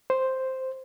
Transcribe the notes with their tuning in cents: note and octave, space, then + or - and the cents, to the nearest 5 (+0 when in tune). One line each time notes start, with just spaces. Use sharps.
C5 +0